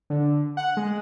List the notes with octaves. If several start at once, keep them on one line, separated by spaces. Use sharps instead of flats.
D3
F#5
G#3